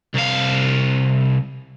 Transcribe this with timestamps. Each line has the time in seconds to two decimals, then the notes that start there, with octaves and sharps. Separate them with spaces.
0.15 C2 F5